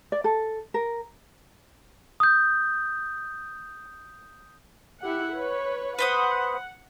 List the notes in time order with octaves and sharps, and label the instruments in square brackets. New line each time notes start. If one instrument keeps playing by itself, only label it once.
[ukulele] D5
A4
A#4
[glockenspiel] D#6 G6
[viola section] E4 G4 F#5
B4 C#5
[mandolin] B4 C5 D#6 [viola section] F#5